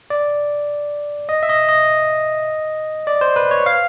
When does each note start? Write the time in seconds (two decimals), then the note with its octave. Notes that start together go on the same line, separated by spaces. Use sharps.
0.10 D5
1.29 D#5
1.43 E5
1.49 D#5
1.69 D#5
3.07 D5
3.21 C5
3.36 B4
3.51 C#5
3.66 F5